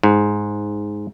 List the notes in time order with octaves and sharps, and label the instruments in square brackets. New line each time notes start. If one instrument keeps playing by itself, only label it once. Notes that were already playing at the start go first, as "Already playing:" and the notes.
[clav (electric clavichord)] G#2